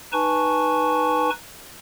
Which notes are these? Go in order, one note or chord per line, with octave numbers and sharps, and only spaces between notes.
D#4 B4 G#5 A5 C#6